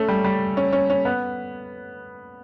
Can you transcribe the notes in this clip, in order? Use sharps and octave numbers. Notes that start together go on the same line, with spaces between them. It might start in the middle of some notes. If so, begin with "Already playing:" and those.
Already playing: A3 C#4
G3
G3
C#4
C#4
C#4
B3